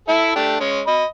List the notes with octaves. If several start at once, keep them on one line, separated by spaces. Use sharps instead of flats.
E4 A4 E5
A3 D4 G4
G#3 C#4
D#5 B5